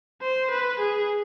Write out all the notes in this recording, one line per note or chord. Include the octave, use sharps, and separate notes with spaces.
C5
B4
G#4